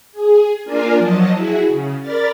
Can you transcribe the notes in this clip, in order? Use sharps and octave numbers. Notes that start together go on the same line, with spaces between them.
G#4
A#3 D4 F4 A#4 D5 G#5
F3 F#3 D#5 A5
E4 F#4 G#4
C#3
A#4 D5 B5 F6 A6